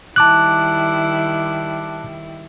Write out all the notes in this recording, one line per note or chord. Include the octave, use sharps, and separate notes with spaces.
D#3 G3 E4 A5 D6 F#6